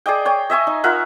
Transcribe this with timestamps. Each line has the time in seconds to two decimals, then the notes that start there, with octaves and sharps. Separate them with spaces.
0.06 G#4 D5 D#5 G5
0.25 C#5 G5
0.50 D#5 E5 G#5 C#6
0.67 D#4
0.84 F4 A#4 E5 F#5